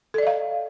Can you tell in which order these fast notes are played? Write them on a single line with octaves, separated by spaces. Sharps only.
A4 D5 D#5 F5